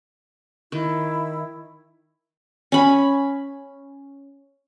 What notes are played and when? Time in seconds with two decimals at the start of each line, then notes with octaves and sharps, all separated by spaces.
0.72 D#3 E4
2.72 C#4 B5